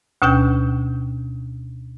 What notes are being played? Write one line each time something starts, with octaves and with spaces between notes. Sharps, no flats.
D2 B2 C#4 G5 G6